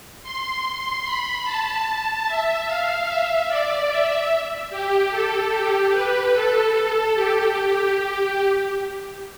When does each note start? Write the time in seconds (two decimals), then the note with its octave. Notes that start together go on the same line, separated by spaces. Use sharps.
0.23 C6
1.04 B5
1.45 A5
2.26 E5
2.67 F5
3.07 E5
3.48 D5
3.89 E5
4.70 G4
5.11 A4
5.51 G4
5.92 B4
6.33 A4
7.14 G4